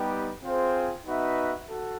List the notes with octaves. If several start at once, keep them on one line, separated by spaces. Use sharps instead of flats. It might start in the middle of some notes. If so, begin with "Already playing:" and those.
Already playing: G3 B3 D#4 G4 B4
C4 F4 G#4 C5
B3 D#4 F#4 B4 E5
F#4 A4